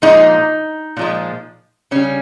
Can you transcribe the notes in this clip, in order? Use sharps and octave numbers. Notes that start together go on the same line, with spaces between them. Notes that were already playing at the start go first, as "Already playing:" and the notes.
A#2 F3 G#3 D#4
A#2 F3 G#3
C#3 G3 C#4